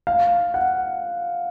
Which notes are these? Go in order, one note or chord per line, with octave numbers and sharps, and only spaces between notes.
F5
F#5